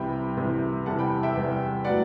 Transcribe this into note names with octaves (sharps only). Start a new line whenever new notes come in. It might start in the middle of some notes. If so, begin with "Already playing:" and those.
Already playing: C2 C3 E3 G5 B5
C2 C3 E3
E2 C3 E3 G3 F#5 A5
G5 B5
E5 G5
E2 C3 E3 G3
A2 F#3 B3 D5 F#5